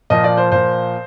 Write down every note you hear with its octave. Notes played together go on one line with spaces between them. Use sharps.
A#2 F3 D#5
D5
C5
A#2 F3 C5